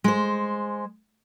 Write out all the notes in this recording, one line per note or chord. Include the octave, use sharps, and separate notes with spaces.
G#3 C5